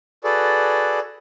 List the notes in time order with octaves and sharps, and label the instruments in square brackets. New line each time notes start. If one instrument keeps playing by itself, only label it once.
[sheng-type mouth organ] F#4 G#4 A4 B4 D5